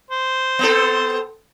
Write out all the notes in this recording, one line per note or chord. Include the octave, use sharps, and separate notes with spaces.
C5
B3 C4 A4